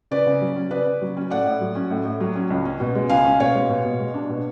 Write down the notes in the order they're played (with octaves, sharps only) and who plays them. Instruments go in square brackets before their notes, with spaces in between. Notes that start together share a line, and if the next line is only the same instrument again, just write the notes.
[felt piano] C#3 B4 D5
C#3
F#3
C#4
C#3 B4 D5
C#3
F#3
C#4
A2 D5 F#5
A2
F#3
C#4
A2
A2
F#3
C#4
C#2
C#4
B2
G#3
C#2 F5 G#5
C#4
B2 C#5 F5
G#3
B2
B2
G#3
D4
B2